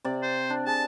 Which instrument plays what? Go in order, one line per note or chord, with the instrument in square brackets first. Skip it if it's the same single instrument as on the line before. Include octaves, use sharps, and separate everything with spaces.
[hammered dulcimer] C3 D5
[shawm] C5
[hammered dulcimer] D4
[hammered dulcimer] G#4 [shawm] A5